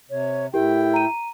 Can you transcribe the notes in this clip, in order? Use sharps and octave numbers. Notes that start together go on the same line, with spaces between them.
C3 C#5
A2 E4 G4 A#4 G5
A#5 D#7